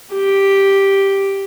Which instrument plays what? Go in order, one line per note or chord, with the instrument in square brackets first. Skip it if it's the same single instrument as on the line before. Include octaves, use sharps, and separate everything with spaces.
[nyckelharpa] G4